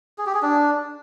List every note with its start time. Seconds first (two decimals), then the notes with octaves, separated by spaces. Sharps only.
0.18 G#4
0.26 G4
0.34 G#4
0.42 D4